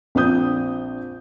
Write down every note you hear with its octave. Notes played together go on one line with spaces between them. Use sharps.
A#1 C4 D4 D#6 G6